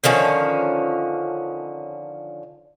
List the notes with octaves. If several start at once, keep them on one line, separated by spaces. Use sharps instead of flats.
D3 D#3 F3 C#4